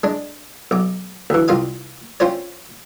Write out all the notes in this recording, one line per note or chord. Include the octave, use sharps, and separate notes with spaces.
G#3 D4
B1 D6
D2 E3
C2 F4 F5 D#6
C4 C#4 F4 C5 C#5